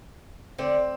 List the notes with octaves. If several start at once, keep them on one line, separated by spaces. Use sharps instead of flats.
D3 C4